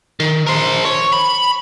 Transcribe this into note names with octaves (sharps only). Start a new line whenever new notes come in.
D#3
A#4 C5
C#5
B5